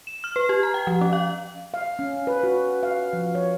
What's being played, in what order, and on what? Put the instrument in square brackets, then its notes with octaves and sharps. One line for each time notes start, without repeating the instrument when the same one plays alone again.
[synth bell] E7
F6
B4
G4
A#5
G5
F3
C#4
F5
[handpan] F5
C#4
B4
F#4
F5
F3
C#5